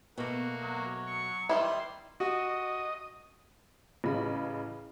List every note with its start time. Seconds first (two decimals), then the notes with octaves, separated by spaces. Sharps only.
0.18 B2 A3 A#3 F#4
0.63 F#3
1.06 C#6
1.49 D#3 G3 E4 B4 C6
2.20 F#4 D#5
4.04 A1 C#3 B5